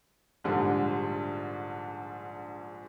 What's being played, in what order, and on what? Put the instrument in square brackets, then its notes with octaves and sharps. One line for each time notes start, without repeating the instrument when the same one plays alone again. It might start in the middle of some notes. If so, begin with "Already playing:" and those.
[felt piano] A#1 G#2 D3 G3